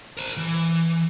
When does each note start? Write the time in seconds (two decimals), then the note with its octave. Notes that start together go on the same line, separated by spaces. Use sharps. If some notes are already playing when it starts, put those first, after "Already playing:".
0.17 A#4 C5
0.37 E3